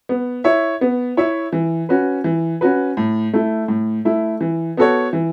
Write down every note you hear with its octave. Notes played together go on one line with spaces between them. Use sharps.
B3
E4 C#5 E5
B3
E4 C#5 E5
E3
C#4 F#4 B4
E3
C#4 F#4 B4
A2
A3 E4
A2
A3 E4
E3
B3 F#4 A4 C#5
E3